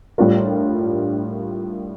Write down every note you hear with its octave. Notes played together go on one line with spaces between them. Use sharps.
A2 G3 D4 F4 A#4